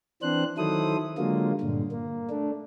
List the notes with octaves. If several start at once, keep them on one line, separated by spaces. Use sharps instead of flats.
E3 C4 D4 C5 F#6
D#3 F#3 E4 A4 C5 D#6
D3 F#3 G#3 A#3 F4
G2 A#2 D3
A#3
A3 D4